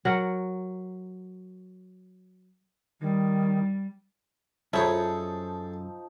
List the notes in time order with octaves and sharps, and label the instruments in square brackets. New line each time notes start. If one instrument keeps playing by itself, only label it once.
[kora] F#3 A#4 F#5
[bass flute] D#3 [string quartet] G3
[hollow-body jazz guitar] F#2 [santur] F3 D#4 E6 [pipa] E4 C#5 [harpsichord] G#4 A4